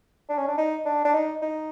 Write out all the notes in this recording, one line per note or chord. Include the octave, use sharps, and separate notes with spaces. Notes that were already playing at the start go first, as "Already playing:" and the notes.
D4
C#4
D4
D#4
D4
D4
D#4
D#4